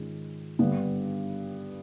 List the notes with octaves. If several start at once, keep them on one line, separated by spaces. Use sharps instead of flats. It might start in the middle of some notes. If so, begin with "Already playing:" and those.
Already playing: G#2 D#3 G#3 C#4 F4
G2 D3 G3 B3